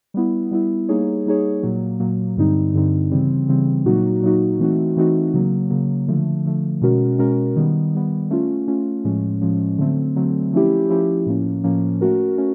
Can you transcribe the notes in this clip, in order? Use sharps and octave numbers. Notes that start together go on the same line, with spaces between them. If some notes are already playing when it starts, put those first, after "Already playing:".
G3 B3 E4
G3 B3 E4
G3 A#3 D#4 G#4 C#5
G3 A#3 D#4 G#4 C#5
A#2 F#3 A#3
A#2 F#3 A#3
G2 D3 G3 C4 D#4
G2 D3 G3 C4 D#4
C#3 E3 G3 C4
C#3 E3 G3 C4
A#2 F#3 A#3 D#4 F#4
A#2 F#3 A#3 D#4 F#4
E3 A3 C4 D#4 F#4
E3 A3 C4 D#4 F#4
C#3 F#3 A#3
C#3 F#3 A#3
D3 F3 A3
D3 F3 A3
B2 G#3 C#4 F#4 A#4
B2 G#3 C#4 F#4 A#4
D#3 G3 B3
D#3 G3 B3
A3 C#4 F4
A3 C#4 F4
A2 F3 G#3 C#4
A2 F3 G#3 C#4
D3 F#3 A3 C4
D3 F#3 A3 C4
F3 A3 C#4 E4 G4
F3 A3 C#4 E4 G4
A2 F3 A#3 C#4
A2 F3 A#3 C#4
A3 C#4 F#4 A#4
A3 C#4